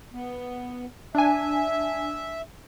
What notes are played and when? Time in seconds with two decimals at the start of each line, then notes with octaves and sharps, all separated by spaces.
0.13 B3
1.15 D4 E5 G#5